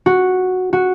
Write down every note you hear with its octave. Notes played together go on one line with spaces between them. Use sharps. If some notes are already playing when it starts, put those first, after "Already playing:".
F#4
F#4